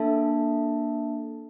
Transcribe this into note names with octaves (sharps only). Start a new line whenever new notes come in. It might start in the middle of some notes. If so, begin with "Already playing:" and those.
Already playing: A#3 D4 A4 E5 A5